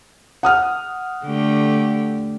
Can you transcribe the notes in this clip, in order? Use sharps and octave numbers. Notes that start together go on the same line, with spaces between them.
F#5 D#6 F6
D3 A3 G4